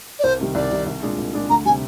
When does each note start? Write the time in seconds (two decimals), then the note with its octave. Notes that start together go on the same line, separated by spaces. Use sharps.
0.19 D5
0.23 C2 C5
0.39 C3 D#3 G3
0.55 C2 D5
0.71 C3 D#3 G3
0.87 C2
1.02 A#2 G#3 D4 G#4
1.18 C2
1.33 A#2 G#3 D4 G#4
1.50 D2 A#5
1.65 G3 G#5
1.69 C3